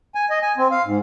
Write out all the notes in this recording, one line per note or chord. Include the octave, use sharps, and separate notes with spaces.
G#5
D#5
G#5
C4
F5
G#2